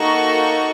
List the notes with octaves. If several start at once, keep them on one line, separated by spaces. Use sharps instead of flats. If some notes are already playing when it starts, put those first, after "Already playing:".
Already playing: A#3 D#4 F#4 A4 C#6